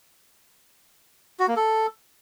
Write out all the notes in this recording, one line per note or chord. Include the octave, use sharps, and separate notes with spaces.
F#4
A#3
A4